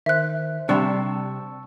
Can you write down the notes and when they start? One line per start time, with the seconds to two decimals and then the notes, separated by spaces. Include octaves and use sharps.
0.06 D#3 C5 E5 F#6
0.69 C3 G3 D4 A5 C#6 E6